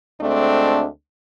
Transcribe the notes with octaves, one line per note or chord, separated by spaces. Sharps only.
D2 G#3 A3 C4 D4